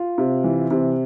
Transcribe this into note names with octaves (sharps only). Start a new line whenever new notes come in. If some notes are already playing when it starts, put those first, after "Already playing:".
Already playing: F4
C3
E3
C3